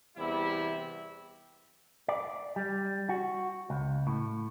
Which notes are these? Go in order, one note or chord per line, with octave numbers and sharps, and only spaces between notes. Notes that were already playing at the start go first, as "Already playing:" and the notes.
E2 C3 G3 E4
D5
G3
F#4
C#2
A2